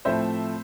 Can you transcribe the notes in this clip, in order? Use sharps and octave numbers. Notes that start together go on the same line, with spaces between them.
A2 F3 A3 C4 C5 E5